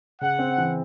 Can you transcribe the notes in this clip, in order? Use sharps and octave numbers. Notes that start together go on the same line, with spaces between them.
C#3 F#5
C4
E3